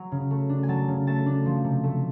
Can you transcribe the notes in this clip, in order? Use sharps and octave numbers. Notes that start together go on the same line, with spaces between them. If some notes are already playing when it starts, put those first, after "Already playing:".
Already playing: F#3
C#3
A3
D4
G#5
F#3 A5
C#3
A3 A5
D4
F3
C3
A3